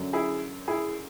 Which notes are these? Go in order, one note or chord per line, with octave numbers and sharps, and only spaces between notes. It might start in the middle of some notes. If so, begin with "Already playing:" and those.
Already playing: F#2 D3 F#3
E4 G#4
E4 G#4